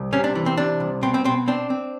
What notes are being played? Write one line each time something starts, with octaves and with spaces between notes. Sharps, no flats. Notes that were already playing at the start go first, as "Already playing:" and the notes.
Already playing: C2
C3 C#4
D4
E3
C4
C3 D4
C2
B2 C4
C4
B2 C4
C4 D4
C4